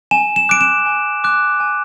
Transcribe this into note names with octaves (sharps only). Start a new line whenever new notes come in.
G#5 E7
E7
D6 F#6 D7
E7
G#5
D6 F#6
G#5